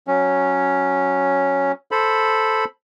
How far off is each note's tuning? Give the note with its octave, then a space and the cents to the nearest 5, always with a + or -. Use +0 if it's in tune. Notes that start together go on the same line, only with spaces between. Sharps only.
F#3 +0 C#4 +0
A4 +0 C5 +0 B5 +0